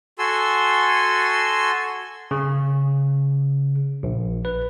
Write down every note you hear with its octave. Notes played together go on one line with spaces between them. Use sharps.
F#4 A4 G#5 C6 E6
C#3
A#1
B4